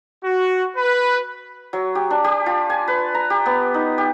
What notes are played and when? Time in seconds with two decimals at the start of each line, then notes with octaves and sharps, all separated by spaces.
0.24 F#4
0.77 B4
1.73 F#3
1.95 G4
2.10 D4
2.24 G4
2.46 F4
2.70 G#5
2.88 B4
3.14 A#5
3.30 G4
3.46 B3
3.74 D#4
3.98 G4